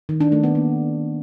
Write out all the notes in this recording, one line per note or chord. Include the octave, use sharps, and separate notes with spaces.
D#3
D4
A3
B3
A#3